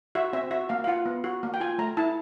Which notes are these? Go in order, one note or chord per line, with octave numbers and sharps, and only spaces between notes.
F#4 E5
C4 E5
F#4 E5
A#3 F5
F5
F4 F#5
B3
F#4
A#3
G5
F4 G#5
A3 A#5
E4 A5